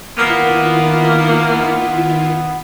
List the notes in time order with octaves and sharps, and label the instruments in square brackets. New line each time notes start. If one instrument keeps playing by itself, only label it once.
[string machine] D#3 E4 F4 [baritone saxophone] A#3 [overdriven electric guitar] B3